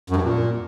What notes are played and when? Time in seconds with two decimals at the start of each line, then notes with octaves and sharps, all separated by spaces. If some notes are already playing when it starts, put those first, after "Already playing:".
0.10 F#2
0.16 G2
0.22 A#2